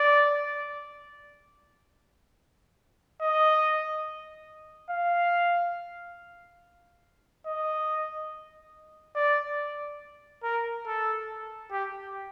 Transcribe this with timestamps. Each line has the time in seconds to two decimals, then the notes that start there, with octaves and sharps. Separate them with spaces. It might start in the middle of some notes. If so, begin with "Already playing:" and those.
Already playing: D5
3.21 D#5
4.90 F5
7.46 D#5
9.16 D5
10.43 A#4
10.87 A4
11.72 G4